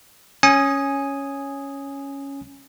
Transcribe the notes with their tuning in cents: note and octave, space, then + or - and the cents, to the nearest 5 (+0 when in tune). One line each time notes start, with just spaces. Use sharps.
C#4 +0 G#5 +0 D#6 +0